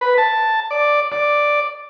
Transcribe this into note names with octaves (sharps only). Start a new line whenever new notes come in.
B4
A5
D5
D5